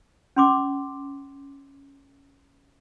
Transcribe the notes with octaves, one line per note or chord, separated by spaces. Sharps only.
C#4 C6 D6